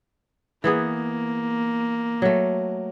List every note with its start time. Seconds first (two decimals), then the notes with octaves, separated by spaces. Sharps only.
0.64 E3 A#3 B3 G#4
2.22 F#3 A3